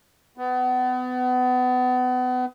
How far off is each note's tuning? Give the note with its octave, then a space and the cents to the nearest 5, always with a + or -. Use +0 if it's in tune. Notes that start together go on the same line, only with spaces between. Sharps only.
B3 +30